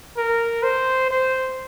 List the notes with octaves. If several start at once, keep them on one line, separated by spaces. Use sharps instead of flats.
A#4
C5
C5